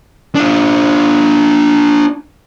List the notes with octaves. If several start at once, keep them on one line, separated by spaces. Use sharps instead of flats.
D4 F4